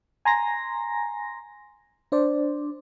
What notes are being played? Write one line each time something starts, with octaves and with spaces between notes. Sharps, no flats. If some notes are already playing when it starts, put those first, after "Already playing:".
G#5 A#5 C6 A#6
D4 C5 D5